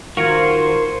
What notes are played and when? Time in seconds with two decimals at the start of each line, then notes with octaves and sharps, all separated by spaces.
0.17 D#3 F4 F#4 A#4 C5 G#6 C#7